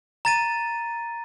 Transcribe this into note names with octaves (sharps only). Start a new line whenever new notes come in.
A#5 A6 D#7